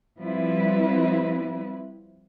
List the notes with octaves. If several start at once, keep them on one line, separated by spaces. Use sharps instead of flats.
F3 G3 C4 E4 B4